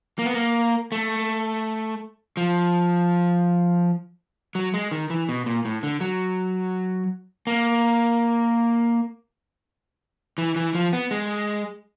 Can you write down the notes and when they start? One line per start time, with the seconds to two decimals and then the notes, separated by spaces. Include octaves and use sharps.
0.19 A#3
0.26 B3
0.34 A#3
0.92 A3
2.37 F3
4.55 F#3
4.74 G#3
4.91 D#3
5.10 E3
5.29 B2
5.46 A#2
5.65 A2
5.83 D3
6.01 F#3
7.47 A#3
10.38 E3
10.56 E3
10.75 F3
10.93 B3
11.11 G#3